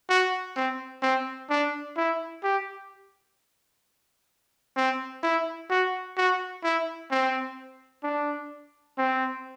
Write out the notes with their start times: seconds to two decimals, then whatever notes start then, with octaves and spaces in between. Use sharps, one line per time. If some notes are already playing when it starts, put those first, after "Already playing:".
0.09 F#4
0.56 C4
1.02 C4
1.50 D4
1.97 E4
2.43 G4
4.76 C4
5.23 E4
5.69 F#4
6.17 F#4
6.63 E4
7.11 C4
8.03 D4
8.98 C4